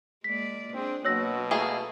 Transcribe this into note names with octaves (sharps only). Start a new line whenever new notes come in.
G#3 A#3 D5 B6
C4 D4 G#4
B2 F#3 A#3 F#4 C#5 E6 A#6
A3 A#3 G#4 A4